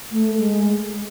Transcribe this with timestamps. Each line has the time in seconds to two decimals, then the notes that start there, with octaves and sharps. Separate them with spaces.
0.12 A3
0.39 G#3